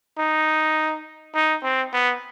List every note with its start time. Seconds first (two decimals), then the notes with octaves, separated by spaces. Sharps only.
0.18 D#4
1.35 D#4
1.63 C4
1.93 B3